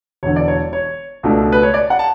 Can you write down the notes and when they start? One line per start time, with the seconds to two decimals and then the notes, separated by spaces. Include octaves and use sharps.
0.23 E1 E2 D3 C#5
0.36 D5
0.48 C#5
0.73 C#5
1.23 C#2 B2 A3 D4
1.52 B4
1.63 C#5
1.74 D5
1.90 F#5
1.99 A5